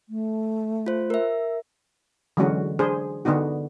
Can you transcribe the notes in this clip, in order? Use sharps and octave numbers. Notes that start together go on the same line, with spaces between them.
A3
F4 C5
A#4 E5
D3 E3 F#3 G#3 C#4 F#4
D4 G#4 C5
D3 B3 D4 D#4 F#4